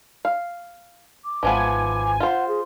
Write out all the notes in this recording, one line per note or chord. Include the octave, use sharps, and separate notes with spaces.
F5
D6
G#1 E3 F3 B3 G#5
F4 C5 F#5
G#4